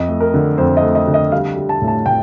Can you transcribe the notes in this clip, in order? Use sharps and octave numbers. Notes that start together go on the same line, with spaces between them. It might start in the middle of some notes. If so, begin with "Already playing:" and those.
Already playing: F2 D#5
A3
A#4
D3
F2 C5
D#5
A3
D#5
D3
D#5
G3 F5
G3
A5
A2
A5
A2 G5